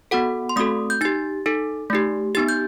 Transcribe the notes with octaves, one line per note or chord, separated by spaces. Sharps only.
B3 F#4 A4 F#5
C6
A3 C4 F#4 A4 D#6
G6
D#4 G4 A6
D#4 A4
A3 D#4 G4
B3 D#4 G4 A6
G6